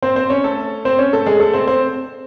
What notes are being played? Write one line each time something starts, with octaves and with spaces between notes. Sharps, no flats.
C4 C5
C4 C5
C#4 C#5
A3 A4
C4 C5
C#4 C#5
A3 A4
G#3 G#4
A3 A4
C4 C5
C4 C5